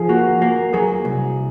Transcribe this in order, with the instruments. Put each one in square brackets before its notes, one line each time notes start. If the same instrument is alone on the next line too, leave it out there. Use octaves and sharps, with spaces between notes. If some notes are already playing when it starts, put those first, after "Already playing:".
Already playing: [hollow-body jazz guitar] F3 [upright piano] G#4
[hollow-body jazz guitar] A#3 [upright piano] F#4
[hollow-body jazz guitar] A#3
[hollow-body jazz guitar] F#3 [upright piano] G#4
[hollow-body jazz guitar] C2